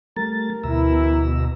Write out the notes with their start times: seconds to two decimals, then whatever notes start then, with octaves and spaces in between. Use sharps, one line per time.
0.16 G3 A3 A#4 A6
0.64 D2 B2 E3 E4 A#5 E6